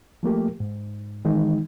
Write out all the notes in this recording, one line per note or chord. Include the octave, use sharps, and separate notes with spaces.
F3 A3 A#3 G4
G#2
D#3 E3 G#3 D#4